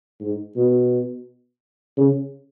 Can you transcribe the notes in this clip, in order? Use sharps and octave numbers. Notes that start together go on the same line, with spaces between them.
G#2
B2
C#3